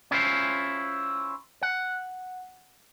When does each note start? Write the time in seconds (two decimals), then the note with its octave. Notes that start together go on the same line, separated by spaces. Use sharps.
0.11 C#4 E4 F4 C5
1.63 F#5